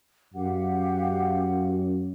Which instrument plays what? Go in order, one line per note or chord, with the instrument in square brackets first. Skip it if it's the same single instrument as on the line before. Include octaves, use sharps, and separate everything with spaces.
[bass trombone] F#2 [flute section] G4 F5 F#5